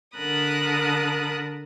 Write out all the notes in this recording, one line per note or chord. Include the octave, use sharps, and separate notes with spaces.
D3 A#4 A5 B5 D#6 F#6